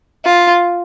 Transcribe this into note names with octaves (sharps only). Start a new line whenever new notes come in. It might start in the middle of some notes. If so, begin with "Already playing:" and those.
F4